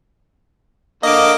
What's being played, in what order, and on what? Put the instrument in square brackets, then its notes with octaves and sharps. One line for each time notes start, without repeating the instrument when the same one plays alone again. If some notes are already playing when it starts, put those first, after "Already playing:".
[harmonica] D3 A#3 [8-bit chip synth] D#5 D6